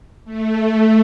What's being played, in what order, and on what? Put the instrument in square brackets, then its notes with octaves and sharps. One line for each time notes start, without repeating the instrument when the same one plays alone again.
[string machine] A3